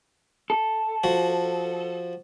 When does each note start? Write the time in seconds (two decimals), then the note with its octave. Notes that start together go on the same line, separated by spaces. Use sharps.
0.50 A4
1.04 F3 F#4